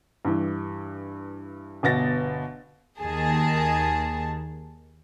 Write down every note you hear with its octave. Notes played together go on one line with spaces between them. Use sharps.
G2 E3
G1 B2 A6 A#6
D#2 D#3 G#4 A5